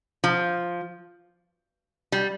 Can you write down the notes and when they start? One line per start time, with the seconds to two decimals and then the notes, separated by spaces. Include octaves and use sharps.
0.24 F3
2.12 G3